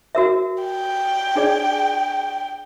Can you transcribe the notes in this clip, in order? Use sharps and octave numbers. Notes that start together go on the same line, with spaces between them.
F#4 A#4 E5
G5
D4 G#4 D5